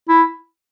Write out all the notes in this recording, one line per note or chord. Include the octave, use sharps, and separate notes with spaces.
E4